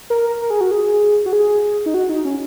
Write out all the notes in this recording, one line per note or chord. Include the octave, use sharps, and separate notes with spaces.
A#4
A#4
G#4
F#4
G#4
F#4
G#4
D#4
F#4
D#4
C#4